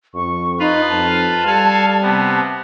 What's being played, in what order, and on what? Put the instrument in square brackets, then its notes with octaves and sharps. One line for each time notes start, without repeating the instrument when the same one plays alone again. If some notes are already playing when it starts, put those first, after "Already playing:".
[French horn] F2 [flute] C#6
[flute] D#4 [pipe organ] F4 B4 F5
[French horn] F2 [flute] A5
[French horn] G3 [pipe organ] A4 F5 G#5
[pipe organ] C3 B3